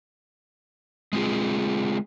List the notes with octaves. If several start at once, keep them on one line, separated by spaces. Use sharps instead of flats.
G#3 C4 F4 G#4